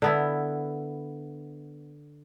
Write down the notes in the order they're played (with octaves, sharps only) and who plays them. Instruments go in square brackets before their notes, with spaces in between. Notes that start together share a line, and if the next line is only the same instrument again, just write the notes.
[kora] D3 B3 E4